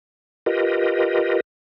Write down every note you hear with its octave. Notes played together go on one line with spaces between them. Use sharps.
F4 G4 A#4 B4 D#5